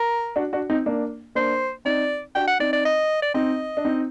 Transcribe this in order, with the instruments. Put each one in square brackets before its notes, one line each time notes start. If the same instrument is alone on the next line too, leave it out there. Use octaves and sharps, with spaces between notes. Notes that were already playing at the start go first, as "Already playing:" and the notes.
Already playing: [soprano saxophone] A#4
[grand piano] D4 F#4
D4 F#4
C4 D#4
A#3 D4
[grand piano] A#3 D4 [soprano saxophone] C5
[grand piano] C4 D#4 [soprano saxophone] D5
[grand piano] D4 F#4 [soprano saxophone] G5
[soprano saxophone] F#5
[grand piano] C4 D#4 [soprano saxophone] D5
[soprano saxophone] D5
D#5
D5
[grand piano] C4 D#4 [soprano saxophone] D#5
[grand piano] D4
C4 D#4